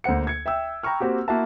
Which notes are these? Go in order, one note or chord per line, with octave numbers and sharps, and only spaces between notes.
D2 A#3 C5 F#5 C#7
G#6 C#7
E5 G5 E6
G5 A#5 B5 C#6 F6
A#3 C4 F#4 G4
A#3 E4 F#4 E5 F#5 A5